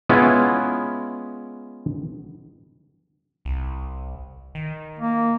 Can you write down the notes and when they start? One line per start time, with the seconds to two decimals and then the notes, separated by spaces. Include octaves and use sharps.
0.09 G#3 B3 C#4 E4 F4
3.45 C2
4.55 D#3
4.99 A#3